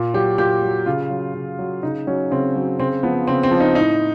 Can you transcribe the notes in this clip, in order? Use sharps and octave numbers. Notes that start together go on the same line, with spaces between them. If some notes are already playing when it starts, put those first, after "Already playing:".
Already playing: A#2
F#3 G4
A#2 G4
F#3
C#3 F4
F#3
C#3
F#3
C#3 D#4
F#3 C#4
C#3 C4
F#3
C#3 C4
F3 B3
C#3 C4
C4
F3
D#4
A2 D#4